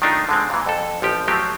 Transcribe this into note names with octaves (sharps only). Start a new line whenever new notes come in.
D#3 A3 D4 D#4 F4
D3 G#3 C4
A#2 E3
F2 A4
A1 F3 G4
F3 F#3 A3 C4 G4